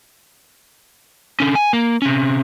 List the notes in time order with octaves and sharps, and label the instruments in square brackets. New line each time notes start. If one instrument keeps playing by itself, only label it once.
[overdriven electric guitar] D3 C#4
G#5
A#3
C3 C#4